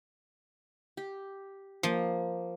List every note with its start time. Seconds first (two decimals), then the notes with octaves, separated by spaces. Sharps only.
0.97 G4
1.83 F3 A#3